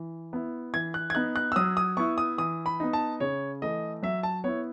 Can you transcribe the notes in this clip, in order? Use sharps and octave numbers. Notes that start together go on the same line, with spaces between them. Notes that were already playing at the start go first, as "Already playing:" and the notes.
Already playing: E3
B3 E4
E3 G#6
F#6
G#6
B3 D#4 F#6
F#6
E6
F#3 D#6
D#6
B3 E4 C#6
D#6
E3 D#6
B5
B3 D#4
A5
C#3 C#5
E3 A3 D#5
F#3 E5
A5
B3 E4 C#5